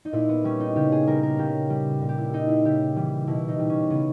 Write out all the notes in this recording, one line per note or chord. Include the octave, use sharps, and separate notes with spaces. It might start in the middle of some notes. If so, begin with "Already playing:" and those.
D#4
A#2 E4
B3
G3 C#4
D#4
C#3 G4
G#4
G3 A#4
A#4
C#3 G4
G3
A#2
G4
E4
G3 D#4
E4
C#3 G4
E3 G3
B2 E4
D#4
G3
C#4
C#3 B3